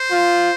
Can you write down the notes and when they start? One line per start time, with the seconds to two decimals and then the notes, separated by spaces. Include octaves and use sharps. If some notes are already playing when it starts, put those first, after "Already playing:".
Already playing: C5
0.11 F4